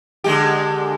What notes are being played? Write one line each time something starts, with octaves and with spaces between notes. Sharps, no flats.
D3 G#3 G4